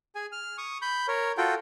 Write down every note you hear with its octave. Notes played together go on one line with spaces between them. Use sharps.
G#4 G#5
F6
C#6 D#6
B5 G6
A#4 C#5
F4 F#4 A4 G5